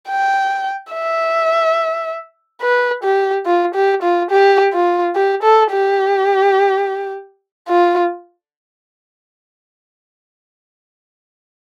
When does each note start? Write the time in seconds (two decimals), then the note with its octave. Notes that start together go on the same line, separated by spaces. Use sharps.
0.09 G5
0.93 E5
2.62 B4
3.04 G4
3.46 F4
3.75 G4
4.03 F4
4.31 G4
4.73 F4
5.16 G4
5.43 A4
5.72 G4
7.68 F4